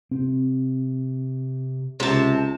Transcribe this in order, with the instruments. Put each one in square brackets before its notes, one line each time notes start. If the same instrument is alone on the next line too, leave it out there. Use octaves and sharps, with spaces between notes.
[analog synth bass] C3 [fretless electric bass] C4
[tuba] C#2 [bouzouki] C3 A5